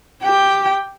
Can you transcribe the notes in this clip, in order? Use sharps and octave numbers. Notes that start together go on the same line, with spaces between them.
G4 G5